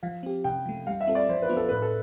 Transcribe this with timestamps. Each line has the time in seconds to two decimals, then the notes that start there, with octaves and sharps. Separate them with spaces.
0.03 F3 F5
0.23 C4 G4
0.44 C3 G5
0.66 F3 A3
0.87 G3 F5
1.01 E5
1.07 C4 F4 A4
1.15 D5
1.29 F3 C5
1.42 B4
1.49 B3 D4 F4 C5
1.57 A4
1.69 A2 B4
1.82 A4